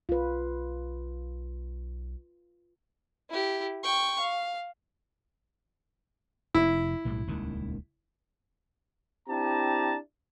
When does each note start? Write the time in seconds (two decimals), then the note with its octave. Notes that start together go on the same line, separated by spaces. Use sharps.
0.09 B1 F4 B4
3.30 E4 G4
3.84 G5 C#6
4.19 F5
6.54 F1 E4
7.05 B1 A2 G3
7.27 D#1 C#2 D#3
9.29 C4 D4 E4 G4 A5 A#5